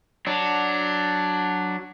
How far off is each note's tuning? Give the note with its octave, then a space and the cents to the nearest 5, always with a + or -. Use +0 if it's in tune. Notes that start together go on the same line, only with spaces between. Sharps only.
F#3 +0 D4 +0